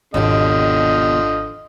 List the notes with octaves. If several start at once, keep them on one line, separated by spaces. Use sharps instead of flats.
G#1 D#2 B2 D3 F3 G4 D#5